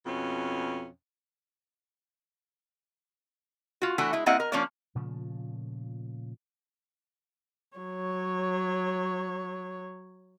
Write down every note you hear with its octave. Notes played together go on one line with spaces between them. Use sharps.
F2 B2 C#4
F4 F#4
E3 A3 D4 E4 F#4
G#3 E4
G3 A#3 C4 E4 D#5 F#5
A#4
F3 A#3 C#4 D4 C#5 D5
A#2 C#3 F3 A3
F#3 C#5